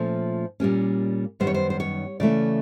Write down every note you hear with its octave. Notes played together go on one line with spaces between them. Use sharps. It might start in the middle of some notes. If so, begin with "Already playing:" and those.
Already playing: A#2 F3 A3 C#4
A#2 G3 A#3 C#4
F#2 D#3 G3 B3 C5
C#5
C5
C5
C#5
C#3 E3 A3 C#4 D5